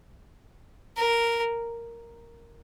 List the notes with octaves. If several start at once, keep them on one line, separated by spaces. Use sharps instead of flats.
A#4